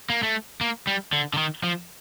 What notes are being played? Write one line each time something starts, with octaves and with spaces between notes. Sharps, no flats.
A#3
A3
A#3
G3
D3
D3
D#3
F3